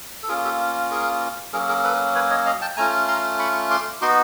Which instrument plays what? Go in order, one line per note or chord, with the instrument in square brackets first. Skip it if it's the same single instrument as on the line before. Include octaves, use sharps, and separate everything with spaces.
[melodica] A4
A#3 C#4 F4 G#4 A#4
G4 A4
G#4 A#4
F#3 A#3 C#4 G#4 A#4
G#4 A#4
A4 B4
B4 C#5
C#5 D#5
D#5 F5
G5 A5
A3 C#4 F4 G#5 A#5
A#5 C6
B5 C#6
C6 D6
B3 D#4 F#4 C6 D6